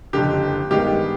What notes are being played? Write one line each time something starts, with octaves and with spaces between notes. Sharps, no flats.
F#1 F2 D3 G4
G2 D#3 G#3 B3 G4